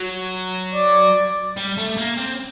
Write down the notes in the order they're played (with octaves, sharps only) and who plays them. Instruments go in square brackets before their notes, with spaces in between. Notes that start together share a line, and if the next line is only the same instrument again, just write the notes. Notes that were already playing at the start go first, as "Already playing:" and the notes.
Already playing: [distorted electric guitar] F#3
[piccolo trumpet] D5
[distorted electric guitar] G3
A3
A#3
C4